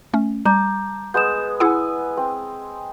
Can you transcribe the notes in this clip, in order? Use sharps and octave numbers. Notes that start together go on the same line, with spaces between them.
A3 C#4
G3 A5 A#5 D6 G6
G#3 B3 G6 E7
E4 G#4 B4 F#5 G#5 E6
C4